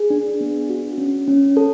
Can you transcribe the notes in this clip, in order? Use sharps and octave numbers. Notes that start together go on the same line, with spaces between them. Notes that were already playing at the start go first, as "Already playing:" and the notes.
Already playing: G#4
D4
B3
F#4
C#4
C#4
A4